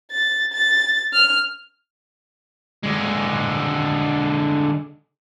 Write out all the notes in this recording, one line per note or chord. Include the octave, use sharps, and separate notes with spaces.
A6
A6
F6
D3 G#3